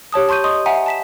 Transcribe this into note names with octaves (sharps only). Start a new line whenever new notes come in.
G4 C#5 A5 D#6
A5 C6 C#6 G6 D#7
D#5 C6 C#6 D#6
E5 F#5 G#5 A#5
A5 B6 E7